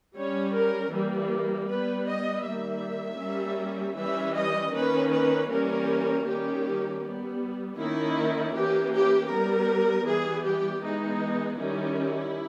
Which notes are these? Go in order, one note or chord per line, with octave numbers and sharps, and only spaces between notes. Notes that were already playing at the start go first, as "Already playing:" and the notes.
G3 C#4 C#5
A#4
E3 G3 A#3
G3 B3 B4
D#5
D#3 G3 A#3 E5
G3 A#3 C#4
E3 G3 C#4 E5
D#5
D#3 A#3 C#4 B4
B4
E3 G3 A#3 C#4 A#4
D#3 G3 A#3 C#4 G4
G3 B3
D#3 A#3 C#4 E4
E3 A#3 C#4 G4
G4
G3 B3 A#4
E3 G3 B3 G#4
G4
E3 G#3 B3 D#4
D#3 G3 C#4 E4